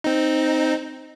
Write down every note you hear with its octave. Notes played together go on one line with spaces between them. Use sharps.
C4 D#4